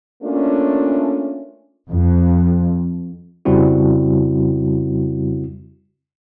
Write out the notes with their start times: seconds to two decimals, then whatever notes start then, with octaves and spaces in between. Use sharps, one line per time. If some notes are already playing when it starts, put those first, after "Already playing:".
0.23 A3 A#3 C#4 D4 F4
1.88 F2
3.45 F2 C#3 G3 C4 E4 F#4